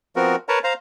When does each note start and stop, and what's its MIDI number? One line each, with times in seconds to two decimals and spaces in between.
0.16 0.36 53
0.16 0.36 59
0.16 0.36 60
0.16 0.36 66
0.16 0.36 70
0.49 0.59 70
0.49 0.59 71
0.49 0.59 73
0.49 0.59 81
0.49 0.59 82
0.64 0.73 72
0.64 0.73 77
0.64 0.73 82